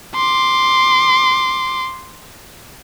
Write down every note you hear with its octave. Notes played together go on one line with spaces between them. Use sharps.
C6 D6